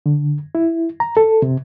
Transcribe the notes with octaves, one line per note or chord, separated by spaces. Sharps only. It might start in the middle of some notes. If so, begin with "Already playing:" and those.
D3
E4
A#5
A4
C3